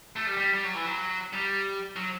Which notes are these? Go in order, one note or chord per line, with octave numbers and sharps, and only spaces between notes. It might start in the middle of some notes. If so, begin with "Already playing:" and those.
A3
G3
G3
G3
F#3
E3
F#3
G3
F#3